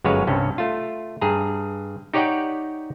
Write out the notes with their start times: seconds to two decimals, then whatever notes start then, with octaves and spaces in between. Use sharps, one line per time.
0.04 G1 F#2 G#3 B4 C#5 F5
0.27 C2 G2 C#4
0.58 A3 F4
1.21 G2 G#4 A#5
2.14 D#4 G4 C#5 D5 F#5 G5